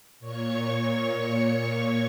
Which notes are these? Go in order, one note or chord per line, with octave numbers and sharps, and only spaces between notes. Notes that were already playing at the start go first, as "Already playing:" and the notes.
A#2 C#5 C#6